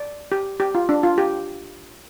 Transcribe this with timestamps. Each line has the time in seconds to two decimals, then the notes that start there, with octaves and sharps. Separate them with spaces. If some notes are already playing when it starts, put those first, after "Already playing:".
Already playing: D5
0.32 G4
0.60 G4
0.75 F4
0.89 D4
1.03 F4
1.18 G4